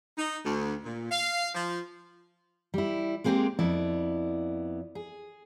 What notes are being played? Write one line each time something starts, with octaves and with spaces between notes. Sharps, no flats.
D#4
D2
A#2
F5
F3
G3 E4
G#3 A#3 C4 C#4 G4 G#4
F2 B3 E4 D5
G#4